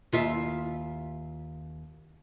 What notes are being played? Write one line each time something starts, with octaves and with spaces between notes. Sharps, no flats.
D#2 F4 E5